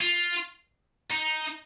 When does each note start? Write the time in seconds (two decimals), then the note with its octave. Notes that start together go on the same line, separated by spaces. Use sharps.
0.01 F4
1.11 D#4